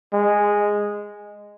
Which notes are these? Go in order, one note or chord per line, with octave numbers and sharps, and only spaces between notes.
G#3